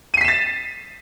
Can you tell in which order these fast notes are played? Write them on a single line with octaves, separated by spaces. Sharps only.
D#7 C7 B6 E7 A6